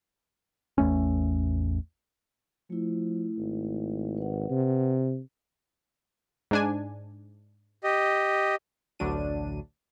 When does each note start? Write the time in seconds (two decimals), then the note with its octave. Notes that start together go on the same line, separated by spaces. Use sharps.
0.78 A1 E2 A3 C#4
2.70 F3 A3 E4
3.38 G#1
4.18 B4 F#5
4.50 C3
6.51 G#2 D4 G#5
7.84 G4 D#5
8.99 A1 D2 F#3 D4 D#7